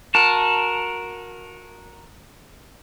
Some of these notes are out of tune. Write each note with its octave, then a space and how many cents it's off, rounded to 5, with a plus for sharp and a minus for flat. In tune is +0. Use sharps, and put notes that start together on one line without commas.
F#4 -25 A#4 +0 A5 +0